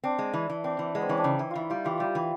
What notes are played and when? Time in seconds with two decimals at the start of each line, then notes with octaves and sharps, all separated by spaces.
0.04 C4 D4
0.19 G#3
0.34 E3
0.50 E3
0.64 C4 D4
0.79 E3
0.95 G#3 B3
1.02 C4
1.09 E3 C#4
1.17 D4
1.24 C#3 D#4
1.39 E3
1.51 E3 E4 F4
1.70 G3 D#4 F4
1.84 E3 F4 G4
2.00 G3
2.15 E3